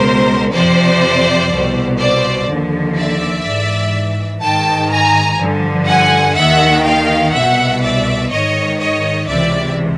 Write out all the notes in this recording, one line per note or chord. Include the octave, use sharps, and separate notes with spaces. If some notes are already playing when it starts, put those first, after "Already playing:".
Already playing: C#2 B2 A#4 C5
F2 C3 F3 C5 D5
C2 B2
C5 D5
D#2 D3 F3
D5 E5
G#2 E3
G#2 D#3 G5 A5
G#5 A#5
G2 D3 F3
F#5 G#5
D#2 D#3 E5 F#5
F5 G5
C2 B2 E5 F#5
D5 E5
G#2 D#3 C#5 D#5
C#5 D#5
C#2 C3 E3 D5 E5